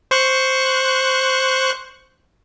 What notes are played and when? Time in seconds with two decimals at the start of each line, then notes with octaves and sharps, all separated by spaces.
0.11 C5 C#6 F#6